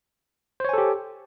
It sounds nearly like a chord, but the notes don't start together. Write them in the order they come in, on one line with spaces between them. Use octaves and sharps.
C5 C#5 G#5 A4 G4